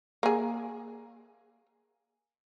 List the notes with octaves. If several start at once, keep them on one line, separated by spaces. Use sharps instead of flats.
A#3 G#4